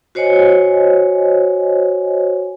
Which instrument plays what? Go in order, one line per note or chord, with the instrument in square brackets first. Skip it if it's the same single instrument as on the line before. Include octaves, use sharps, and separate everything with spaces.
[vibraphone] F#4 C5 C#5 D#5 G#5